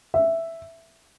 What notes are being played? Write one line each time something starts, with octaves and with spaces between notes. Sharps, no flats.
E5